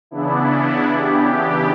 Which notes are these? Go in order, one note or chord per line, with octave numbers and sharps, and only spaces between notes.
C#3 E3 B3 D4 E4
G4